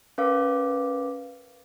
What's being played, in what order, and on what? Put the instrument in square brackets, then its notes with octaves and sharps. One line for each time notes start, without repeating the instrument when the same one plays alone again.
[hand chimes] C#4 A#4 B4 F5 D6